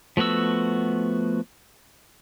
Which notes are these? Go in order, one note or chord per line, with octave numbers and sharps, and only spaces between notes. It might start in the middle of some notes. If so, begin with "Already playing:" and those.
F3 A3 B3 F#4 E6